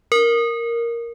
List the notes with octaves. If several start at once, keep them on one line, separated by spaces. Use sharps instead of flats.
A#4